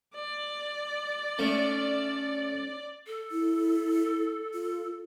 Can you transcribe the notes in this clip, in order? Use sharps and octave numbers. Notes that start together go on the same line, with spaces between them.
D5
A3 C#4 D4
A4
E4
F4